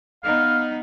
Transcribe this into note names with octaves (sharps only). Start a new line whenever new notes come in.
B3 D#4 F5